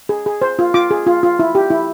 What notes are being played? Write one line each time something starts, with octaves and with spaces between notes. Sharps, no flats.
G#4
G#4
C5
F4
F4 D6
G#4
F4
F4
E4
G4
E4